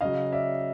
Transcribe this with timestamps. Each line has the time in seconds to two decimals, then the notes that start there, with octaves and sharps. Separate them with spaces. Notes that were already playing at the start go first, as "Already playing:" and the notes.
0.01 C#3 F#3 D#5 F5
0.32 D5 E5